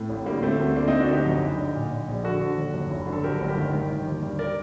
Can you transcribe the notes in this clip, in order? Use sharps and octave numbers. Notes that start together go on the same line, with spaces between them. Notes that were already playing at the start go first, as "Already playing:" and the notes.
Already playing: A2 A3 C4
A1
D3 G3 A#3
D3 A3 C4
D2 A3 C4
D3 A#3 D4
D3 C4 D#4
D4 F#4
D2 D#4 G4
F#2
F#1
D3
A#2
A#2
A#1
D3 F#4 A4
D3
D#2
F#2
F#1
D3
A4
F#2 G4 A#4
G1
G4 A#4
D#3
D#3
D#3
D#2
G2
A#4 D5